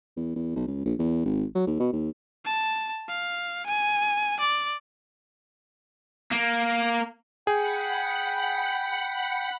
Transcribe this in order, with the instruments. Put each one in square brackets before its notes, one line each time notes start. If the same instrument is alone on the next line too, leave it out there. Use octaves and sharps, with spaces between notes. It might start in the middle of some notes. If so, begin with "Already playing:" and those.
[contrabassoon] E2
E2
B1
C#2
A#1
E2
G#1
F#3
D#2
B2
D#2
[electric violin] A5
F5
G#5
D5
[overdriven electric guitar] A#3
[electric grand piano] G#4 [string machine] F#5 B5 C#7 [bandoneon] G5